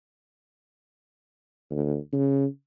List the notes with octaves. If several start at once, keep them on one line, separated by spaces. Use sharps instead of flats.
D2
C#3